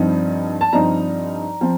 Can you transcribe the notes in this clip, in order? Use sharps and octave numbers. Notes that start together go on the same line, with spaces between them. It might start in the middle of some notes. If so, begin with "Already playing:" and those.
Already playing: G2 F3 C4 D#4
A5
G2 F3 C4 D#4 A#5
F3 C4